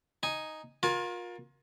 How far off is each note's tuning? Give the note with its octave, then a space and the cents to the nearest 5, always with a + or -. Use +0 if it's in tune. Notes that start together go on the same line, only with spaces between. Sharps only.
D#4 +0 G#5 +0
F4 +35 A#4 +25 G#5 +45